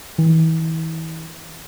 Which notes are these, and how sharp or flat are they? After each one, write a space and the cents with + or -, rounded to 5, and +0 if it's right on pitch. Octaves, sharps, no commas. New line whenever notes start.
E3 -35